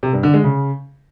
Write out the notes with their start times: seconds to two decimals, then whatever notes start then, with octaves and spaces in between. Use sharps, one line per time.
0.03 C3
0.13 G2
0.23 D3
0.34 G#3
0.44 C#3